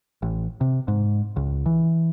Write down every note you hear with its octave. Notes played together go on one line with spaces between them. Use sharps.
A1
C3
G#2
C#2
E3